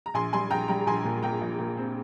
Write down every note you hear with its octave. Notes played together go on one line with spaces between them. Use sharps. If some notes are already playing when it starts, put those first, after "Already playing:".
A#5
A#1 G#5 C6
G3 G#5 C6
A#1 G5 A#5
G3 G5 A#5
A#1 G#5 C6
A#2
A#2 G5 A#5
A#1
A#2
C4